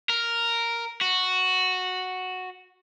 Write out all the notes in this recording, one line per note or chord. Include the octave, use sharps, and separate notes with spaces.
A#4
F#4